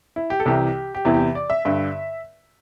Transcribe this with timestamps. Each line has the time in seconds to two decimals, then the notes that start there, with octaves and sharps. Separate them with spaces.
0.16 E4
0.30 G4
0.40 A4
0.46 C2 C3 E3 G4
0.95 G4
1.05 E2 C3 E3 E4
1.14 G4
1.20 E4
1.35 D5
1.50 E5
1.65 G2 D3 E5